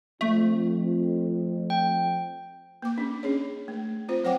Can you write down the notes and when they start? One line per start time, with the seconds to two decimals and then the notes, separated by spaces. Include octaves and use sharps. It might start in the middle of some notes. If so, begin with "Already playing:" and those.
0.21 F2 A3
1.70 G5
2.82 A#3 D6
2.97 C#4 D4
3.23 C#4 G#4 C#5
3.68 A3
4.08 C4 F4 C5
4.24 F#3 C5 C#5 F#5 G5 D6